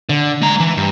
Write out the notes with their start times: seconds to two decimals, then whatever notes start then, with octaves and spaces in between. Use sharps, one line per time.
0.09 D3
0.42 G#3 A#5
0.60 E3
0.77 G2